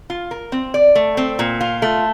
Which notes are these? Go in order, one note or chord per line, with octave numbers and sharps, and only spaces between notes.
F4
A#4
C4
D5
A3
C4
A#2
F4
A3